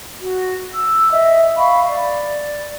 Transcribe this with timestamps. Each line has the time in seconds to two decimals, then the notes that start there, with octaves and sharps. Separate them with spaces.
0.20 F#4
0.73 E6
1.11 D#5 E5
1.56 F5 B5 C#6
1.87 D5